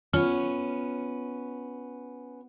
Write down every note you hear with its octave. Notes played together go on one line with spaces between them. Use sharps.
B3 C#4 F4